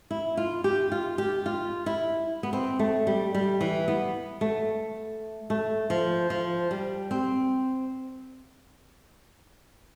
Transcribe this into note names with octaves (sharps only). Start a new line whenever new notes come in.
E4
F4
G4
F4
G4
F4
E4
B3
C4
A3
G3
G3
E3
B3
A3
A3
F3
F3
G3
C4